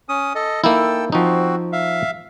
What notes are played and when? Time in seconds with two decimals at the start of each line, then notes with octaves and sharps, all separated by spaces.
0.09 C#4 D#6
0.35 A4 D#5
0.64 A#3 D#4 E4 A4 G5 E6
1.12 F3 C4 D#4 F#4
1.72 E5 F5